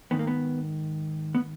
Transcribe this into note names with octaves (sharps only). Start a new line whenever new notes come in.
G#2 D#3 B3
A#3
B3
B3